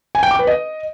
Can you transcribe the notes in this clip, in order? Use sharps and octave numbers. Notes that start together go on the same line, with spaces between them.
G#5
G5
D6
B4
D#5